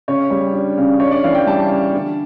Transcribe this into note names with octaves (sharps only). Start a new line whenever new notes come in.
C#3 C#5
G3
D4
C#3
D4 C#5
D5
E3 F5
G5
G3 A5
C#3
D3